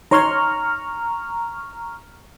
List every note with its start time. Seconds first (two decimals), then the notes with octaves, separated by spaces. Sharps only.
0.11 D#4 C#5 A#5 C6 C#6 F6